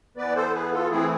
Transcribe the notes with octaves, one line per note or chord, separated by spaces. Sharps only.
E3 B3 B4 D5
A4 C5
A4
G#4 B4
F4 A4
E3 A3 C4 E4 G#4